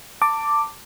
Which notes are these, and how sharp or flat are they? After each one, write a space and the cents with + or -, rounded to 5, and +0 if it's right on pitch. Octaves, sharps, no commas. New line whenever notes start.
A5 +25 D6 +0